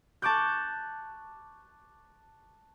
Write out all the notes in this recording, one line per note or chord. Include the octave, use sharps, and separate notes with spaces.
A5 C#6 D6 F#6 G6